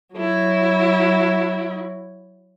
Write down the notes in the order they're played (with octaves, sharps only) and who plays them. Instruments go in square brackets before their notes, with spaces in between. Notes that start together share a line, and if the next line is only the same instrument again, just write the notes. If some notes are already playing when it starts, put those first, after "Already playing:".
[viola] F#3 E4